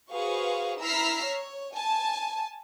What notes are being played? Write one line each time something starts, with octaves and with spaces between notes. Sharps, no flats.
F#4 G#4 B4 C5 F5 C#6
E4 A#5 E6 F6 B6 C7
C#5
G#5 A5